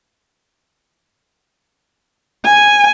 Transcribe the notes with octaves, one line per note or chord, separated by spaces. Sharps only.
G#5